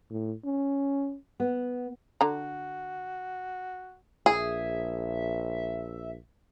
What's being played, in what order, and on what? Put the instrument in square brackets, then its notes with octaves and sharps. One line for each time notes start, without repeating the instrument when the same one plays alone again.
[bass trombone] A2
C#4
[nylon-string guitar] B3
[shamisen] D3 A#5 [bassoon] F#4
[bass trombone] A#1 [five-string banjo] G#4 [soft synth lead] E5